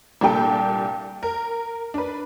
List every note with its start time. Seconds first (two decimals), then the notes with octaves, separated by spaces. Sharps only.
0.21 C2 A#2 D4 G4 A4 G5
1.23 A#4
1.94 D4 B4